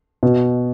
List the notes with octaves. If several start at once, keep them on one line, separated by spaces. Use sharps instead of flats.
B2